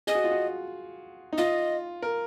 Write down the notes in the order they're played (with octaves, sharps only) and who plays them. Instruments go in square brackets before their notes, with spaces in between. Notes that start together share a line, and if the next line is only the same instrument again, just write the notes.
[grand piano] G#4 [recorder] D#5
[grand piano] F#4
F4
F#4
D#4
[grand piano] F4 [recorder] D#5
[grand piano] A#4